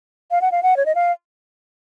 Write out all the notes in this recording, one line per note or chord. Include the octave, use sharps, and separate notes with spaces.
F5
F#5
F5
F#5
C#5
D#5
F5